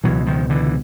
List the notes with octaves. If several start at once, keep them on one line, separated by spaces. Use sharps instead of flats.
C#2 B2 E3 F#3
D#3 F3
D3 E3